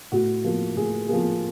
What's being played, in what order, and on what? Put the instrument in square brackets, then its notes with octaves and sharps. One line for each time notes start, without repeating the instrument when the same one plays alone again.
[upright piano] A2 F#4
F3 A#3
A2 G#4
F3 A#3 G#4